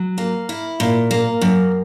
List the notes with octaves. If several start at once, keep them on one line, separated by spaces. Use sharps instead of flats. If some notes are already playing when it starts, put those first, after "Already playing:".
Already playing: F#3
A#3
E4
A#2
A#3
F#2